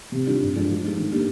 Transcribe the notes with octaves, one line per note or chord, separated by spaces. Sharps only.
C3
D#3 G3 D4 F4
G2
F3 G#3 D4
F3
G#3 D#4
D#3
A#3 D4 G4